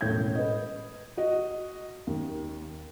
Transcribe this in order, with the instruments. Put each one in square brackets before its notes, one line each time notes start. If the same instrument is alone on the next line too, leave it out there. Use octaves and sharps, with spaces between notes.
[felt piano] E1 A2 C#4 G6 G#6
B4 D#5
F#4 D#5
D#2